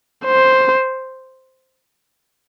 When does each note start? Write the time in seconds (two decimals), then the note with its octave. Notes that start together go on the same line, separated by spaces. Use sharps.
0.25 C5